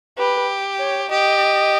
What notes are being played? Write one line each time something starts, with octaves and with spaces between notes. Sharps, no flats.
G4 B4
C#5
G4 D#5